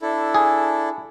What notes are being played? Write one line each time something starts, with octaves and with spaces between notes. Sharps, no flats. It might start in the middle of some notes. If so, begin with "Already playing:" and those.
D4 E4 A4
G#4